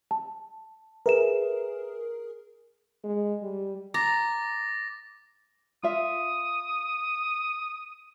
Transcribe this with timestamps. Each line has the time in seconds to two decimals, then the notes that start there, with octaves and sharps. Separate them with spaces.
0.11 A5
1.06 G#4 A#4 B4 E5 E7
3.04 G#3
3.42 G3
3.94 A#5 D6 A6 A#6
5.83 F4 E5 D#6